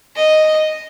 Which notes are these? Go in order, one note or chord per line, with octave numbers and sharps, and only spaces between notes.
D#5